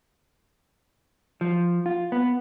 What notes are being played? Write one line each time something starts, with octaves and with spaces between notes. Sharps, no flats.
F3
F4
B3